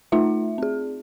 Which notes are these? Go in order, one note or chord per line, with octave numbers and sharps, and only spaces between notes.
A3 D#4 F4 E5
C4 G#4